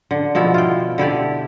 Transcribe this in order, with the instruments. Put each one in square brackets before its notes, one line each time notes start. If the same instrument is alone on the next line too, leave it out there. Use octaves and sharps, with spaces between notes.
[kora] D3
B2 F3 B3 E4
F4 G5
D3 E4 G4 D5